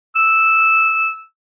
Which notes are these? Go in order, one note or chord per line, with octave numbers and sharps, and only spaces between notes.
E6